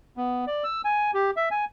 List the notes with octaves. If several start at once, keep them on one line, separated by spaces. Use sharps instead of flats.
B3
D5
E6
G#5
G4
E5
G#5